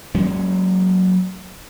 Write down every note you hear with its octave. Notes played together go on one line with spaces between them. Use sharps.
F#3 G#3 A#3 C#4